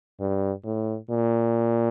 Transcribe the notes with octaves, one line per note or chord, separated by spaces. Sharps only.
G2
A2
A#2